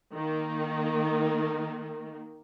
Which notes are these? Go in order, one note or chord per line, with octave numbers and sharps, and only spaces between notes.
D#3 A#3